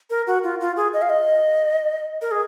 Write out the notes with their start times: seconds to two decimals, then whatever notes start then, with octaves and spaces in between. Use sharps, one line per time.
0.10 A#4
0.27 F#4
0.44 F4
0.60 F4
0.76 G#4
0.93 D#5
1.02 F5
1.09 D#5
2.21 A#4
2.31 G#4